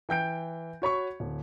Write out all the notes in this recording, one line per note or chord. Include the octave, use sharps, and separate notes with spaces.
E3 G5 G6 D7
F#4 C#5 B5 C#6
D1